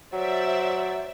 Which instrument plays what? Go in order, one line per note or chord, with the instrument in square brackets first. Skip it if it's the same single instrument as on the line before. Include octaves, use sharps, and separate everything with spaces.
[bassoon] F#3 [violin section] C5 D5 E5